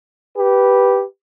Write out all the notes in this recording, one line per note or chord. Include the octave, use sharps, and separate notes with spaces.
G4 B4